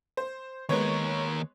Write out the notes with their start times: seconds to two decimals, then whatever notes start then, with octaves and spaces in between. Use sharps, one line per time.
0.17 C5
0.69 D#2 G#3 B3 A#4 C#5